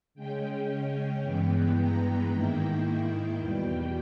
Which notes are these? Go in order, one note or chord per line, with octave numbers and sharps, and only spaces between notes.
C#3 G#3 C#4 G5
G2 E3 G#3 B3 G5
A#5
G#2 D#3 A#3 E4 G5
E2 B2 G3